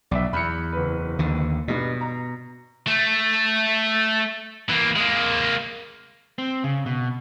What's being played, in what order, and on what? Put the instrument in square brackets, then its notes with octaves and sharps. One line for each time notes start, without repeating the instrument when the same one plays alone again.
[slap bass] B1 [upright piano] D5 E5
[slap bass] E2 [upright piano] B5 C#7
[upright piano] F#1 B4
[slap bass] D#2 D3
[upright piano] G2 D#4 [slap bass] B2
[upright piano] A#5
[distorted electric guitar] A3
E3 A#3
G#3 A#3
[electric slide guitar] C4
C#3
B2